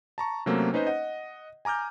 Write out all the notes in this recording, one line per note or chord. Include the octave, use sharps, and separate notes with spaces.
A5 A#5 C#6
C3 F#3 A3 A#3 C4 C#4
C#4 D#4 B4 C5 D#5
D#5 F#5
G#5 A#5 D6 F6 G6